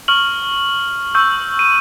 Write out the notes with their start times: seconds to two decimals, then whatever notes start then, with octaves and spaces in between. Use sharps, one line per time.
0.08 C#6 F6 F#7
1.15 C#6 E6 G6
1.59 D#7